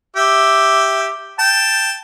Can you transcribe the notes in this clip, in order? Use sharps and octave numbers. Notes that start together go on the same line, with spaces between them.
G4 E5
G5 A5